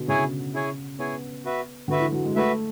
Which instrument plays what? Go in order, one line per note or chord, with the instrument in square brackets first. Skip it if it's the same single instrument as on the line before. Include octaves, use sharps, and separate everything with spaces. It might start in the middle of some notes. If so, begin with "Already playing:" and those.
Already playing: [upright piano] B2 D3
[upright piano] C#3 [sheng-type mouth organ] E4 G#4 C#5 G#5
[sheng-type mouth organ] E4 G#4 C#5 G#5
[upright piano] B3 [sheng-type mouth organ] E4 G#4 C#5 G#5
[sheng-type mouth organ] F#4 B4 E5
[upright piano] D3 [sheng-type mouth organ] F#4 B4 E5
[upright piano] E3
F#3
G#3
[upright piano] A3 [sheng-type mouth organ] F#4 B4 E5